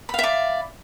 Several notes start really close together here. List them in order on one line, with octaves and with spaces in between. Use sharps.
B5 F5 E5 D5